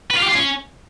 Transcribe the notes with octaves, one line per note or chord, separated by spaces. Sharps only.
B4
F4
G4
F4
C#4